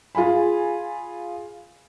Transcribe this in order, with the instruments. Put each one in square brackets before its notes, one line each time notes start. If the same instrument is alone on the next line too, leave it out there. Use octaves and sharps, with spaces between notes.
[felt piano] F4 G#4 G#5 B5